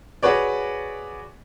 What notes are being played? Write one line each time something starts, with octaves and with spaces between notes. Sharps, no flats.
F#4 G#4 B4 C#5 D5